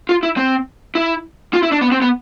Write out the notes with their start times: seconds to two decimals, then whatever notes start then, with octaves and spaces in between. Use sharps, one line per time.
0.09 F4
0.23 E4
0.37 C4
0.95 E4
1.53 F4
1.63 E4
1.72 D4
1.81 B3
1.92 C4
2.02 B3